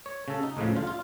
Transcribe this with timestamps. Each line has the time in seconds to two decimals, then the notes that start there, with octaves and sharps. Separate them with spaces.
0.06 C#5
0.28 C#3 A4
0.43 D#4
0.57 C#2 A2 C#3 F3
0.75 D3 F4
0.87 F4